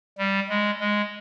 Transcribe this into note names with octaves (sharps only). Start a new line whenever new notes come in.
G3
G#3
G#3